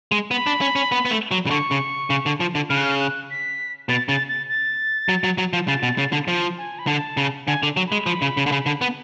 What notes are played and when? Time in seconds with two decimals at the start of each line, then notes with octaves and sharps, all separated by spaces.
0.12 G#3
0.31 B3 B5
0.47 D4
0.61 C#4
0.76 C#4
0.92 B3
1.05 B3
1.11 A3
1.31 F#3
1.46 C#3
1.50 D3 C#6
1.71 C#3
2.10 C#3
2.26 D3
2.40 F3
2.55 D3
2.70 C#3 F6
2.77 F#6
2.84 F6
3.00 F#6
3.30 B6
3.89 B2 A6
4.09 C#3 A6
4.29 A6
4.49 A6
5.09 F#3
5.24 F#3
5.38 F#3
5.53 F3
5.68 C#3 A6
5.83 B2
5.98 C#3
6.12 D3
6.28 F3
6.58 G#5
6.79 B5
6.87 D3 A5
7.17 C#3
7.47 D3 G#5
7.63 D3
7.77 F#3
7.87 G#3 B5
8.06 F3
8.22 C#3
8.37 C#3
8.46 D3
8.52 C#3
8.66 D3
8.81 B3